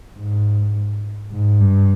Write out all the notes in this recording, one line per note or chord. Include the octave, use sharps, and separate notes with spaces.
G#2
G#2
G2